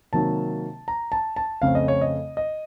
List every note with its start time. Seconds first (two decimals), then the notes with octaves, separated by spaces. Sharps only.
0.13 C3 D#3 F#3 A#3 A5
0.88 A#5
1.12 A5
1.36 A5
1.62 F2 C#3 A3 C4 F5
1.75 D#5
1.88 C#5
2.01 D#5
2.37 D#5